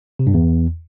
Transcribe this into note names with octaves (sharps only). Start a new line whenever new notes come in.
C3
G2
E2